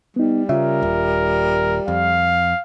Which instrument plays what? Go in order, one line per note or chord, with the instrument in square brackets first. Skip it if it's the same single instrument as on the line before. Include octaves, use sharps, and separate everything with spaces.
[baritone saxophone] G3 [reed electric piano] B3 D#4
[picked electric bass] C#3 [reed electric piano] F4 E5 [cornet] A#4
[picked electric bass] D#1
[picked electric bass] F2 [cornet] F5